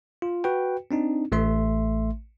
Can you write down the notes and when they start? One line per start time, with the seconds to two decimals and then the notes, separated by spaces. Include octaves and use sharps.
0.22 F4
0.44 F#4 B4 G5
0.91 C4 D4 D#4
1.32 A1 A3 E5 C6